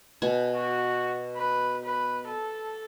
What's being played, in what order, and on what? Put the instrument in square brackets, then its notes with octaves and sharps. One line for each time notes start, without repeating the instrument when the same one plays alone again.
[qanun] B2 F#5 G#5
[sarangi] F#4
B4
B4
A4